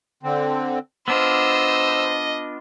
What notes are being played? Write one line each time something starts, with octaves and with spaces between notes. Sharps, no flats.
D3 C4
B3 D4 F4 C5 D#5 E6